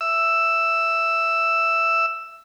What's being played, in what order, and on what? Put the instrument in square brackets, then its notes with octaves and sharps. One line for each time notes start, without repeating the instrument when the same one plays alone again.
[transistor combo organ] E5 E6